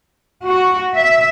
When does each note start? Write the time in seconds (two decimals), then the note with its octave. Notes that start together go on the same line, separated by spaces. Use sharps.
0.48 F#4
0.97 E5